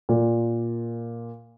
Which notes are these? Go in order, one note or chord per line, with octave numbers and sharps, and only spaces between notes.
A#2